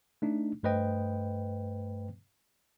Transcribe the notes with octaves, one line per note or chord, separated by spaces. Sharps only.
A3 D4 D#4
G2 A3 B4 C5 D#5 G5